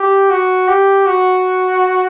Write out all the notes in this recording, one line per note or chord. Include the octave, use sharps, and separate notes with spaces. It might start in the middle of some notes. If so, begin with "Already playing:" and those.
Already playing: G4
F#4
G4
F#4